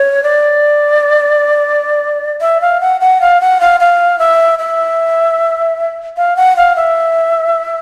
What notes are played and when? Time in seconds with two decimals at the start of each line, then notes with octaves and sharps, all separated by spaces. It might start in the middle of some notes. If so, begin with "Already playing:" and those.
Already playing: C#5
0.23 D5
2.41 E5
2.61 F5
2.81 F#5
3.01 F#5
3.21 F5
3.41 F#5
3.61 F5
3.80 F5
4.19 E5
4.59 E5
6.17 F5
6.36 F#5
6.57 F5
6.76 E5